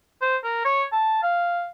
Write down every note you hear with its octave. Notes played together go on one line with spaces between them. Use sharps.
C5
A#4
C#5
A5
F5